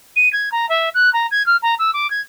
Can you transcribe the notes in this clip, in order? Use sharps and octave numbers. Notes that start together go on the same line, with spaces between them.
D#7
G#6
A#5
E5
F#6
A#5
G#6
F6
A#5
E6
D6
G#6